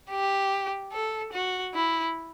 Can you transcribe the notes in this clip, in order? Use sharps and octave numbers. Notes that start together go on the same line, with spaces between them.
G4
A4
F#4
E4